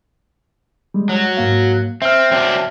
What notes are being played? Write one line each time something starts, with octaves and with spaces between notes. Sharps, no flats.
G3 G#3
F#3
G#2 A#3 F5
C4 E5 F6
F#3 C4 D4